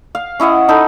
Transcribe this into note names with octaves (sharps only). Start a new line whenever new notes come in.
F5
C#4 E4 D#5 F#5
D#4 A4 B5